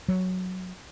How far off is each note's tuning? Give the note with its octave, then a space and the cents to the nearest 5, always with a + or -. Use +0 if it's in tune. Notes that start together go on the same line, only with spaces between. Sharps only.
F#3 +0